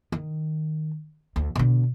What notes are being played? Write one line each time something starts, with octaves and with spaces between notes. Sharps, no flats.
D#3
D2
B2 D3